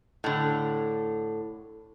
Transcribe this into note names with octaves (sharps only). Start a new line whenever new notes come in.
A2 D3